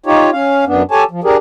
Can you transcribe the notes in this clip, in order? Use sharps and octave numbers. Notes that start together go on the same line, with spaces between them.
D#4 F4 G4 C#5
C#4 F5
F#2 B3 D4
G4 A4 C#5 G#5 A5
F3
D4 G4 G#4 A#4